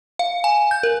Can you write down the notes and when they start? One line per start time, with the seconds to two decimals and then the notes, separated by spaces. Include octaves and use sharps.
0.19 F5
0.44 G#5
0.71 G6
0.83 A#4